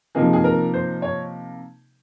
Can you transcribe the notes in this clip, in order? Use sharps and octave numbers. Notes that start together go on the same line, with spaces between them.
C3 F3 A#3 D#4 G#4
G#4
A#4
C5
C#5